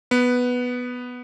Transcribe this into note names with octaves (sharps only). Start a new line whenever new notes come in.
B3 B4